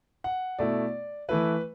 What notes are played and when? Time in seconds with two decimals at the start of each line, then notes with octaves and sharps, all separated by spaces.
0.24 F#5
0.59 B2 A3 E4 D5
1.29 E3 A3 E4 B4